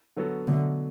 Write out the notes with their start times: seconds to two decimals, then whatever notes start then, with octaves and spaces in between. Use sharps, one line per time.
0.16 D3 F#3 B3 F#4 A4
0.48 B2 D3 F#3 A3